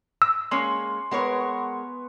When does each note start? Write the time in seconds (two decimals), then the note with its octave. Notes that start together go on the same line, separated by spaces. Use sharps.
0.22 E6
0.51 G#3 A#3 C#4 G#5 C6 C#6
1.11 G#3 B3 A#4 B4 C#5
1.40 C#6